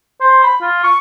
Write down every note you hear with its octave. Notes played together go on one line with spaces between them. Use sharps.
C5
B5
F4
C#6